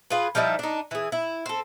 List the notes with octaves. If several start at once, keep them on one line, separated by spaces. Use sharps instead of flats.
F4 G#4 B4
F3 G3 D#4 E4
D4 D#4
E3 G#4
E4
C4 A4